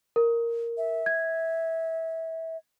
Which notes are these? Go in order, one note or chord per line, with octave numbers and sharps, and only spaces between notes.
A#4
E5
G#6